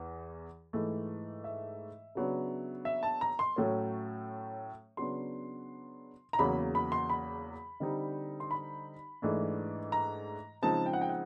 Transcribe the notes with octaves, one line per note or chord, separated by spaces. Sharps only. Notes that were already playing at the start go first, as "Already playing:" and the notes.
Already playing: E2 E3
G#2 E3 A3
E5
C#3 F#3 B3 D4
E5
A5
A#5
C6
A2 F#3 A3 C#4
C#3 F#3 B3 D4 C6
A#5
E2 C#3 F#3 A#3 B5
B5
C6
B5
D3 G3 C4 D#4
C6
B5
G#2 E3 A3 D4
A#5
C#3 F3 G#3 C4 D#4 A5
G5
F#5
G5
F#5